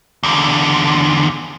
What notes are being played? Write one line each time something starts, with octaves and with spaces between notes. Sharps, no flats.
E2 D3